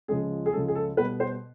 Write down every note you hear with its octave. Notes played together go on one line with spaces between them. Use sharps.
C#2 C#3 F3 G#3 C#4 G#4
G#4
C#2 C#3 F3 G#3 C#4 A4
G#4
A4
B2 G3 B3 B4
C5